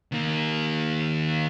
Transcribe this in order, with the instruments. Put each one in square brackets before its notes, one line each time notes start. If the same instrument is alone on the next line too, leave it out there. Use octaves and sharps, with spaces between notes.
[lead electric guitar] D#3 A#3